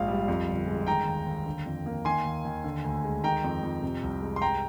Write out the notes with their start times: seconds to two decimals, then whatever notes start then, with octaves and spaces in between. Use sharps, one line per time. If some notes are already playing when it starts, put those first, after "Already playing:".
Already playing: A#1 G#2 F5
0.08 G3
0.28 F2
0.48 G1
0.67 G#3
0.87 D#3 G5 A#5
1.07 D#2
1.27 D#2
1.46 D3
1.66 F2
1.86 A#3
2.05 D#3 G#5 C6
2.25 D#2
2.45 D#2
2.64 D3
2.85 D2
3.04 G#3
3.24 D#3 G5 A#5
3.44 F2
3.63 F2
3.83 C3
4.03 C2
4.22 G#3
4.36 C6
4.42 G2 G5 A#5